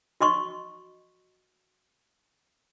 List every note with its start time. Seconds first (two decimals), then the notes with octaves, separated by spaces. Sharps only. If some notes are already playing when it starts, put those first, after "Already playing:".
0.21 F#4 D#5 C6 C#6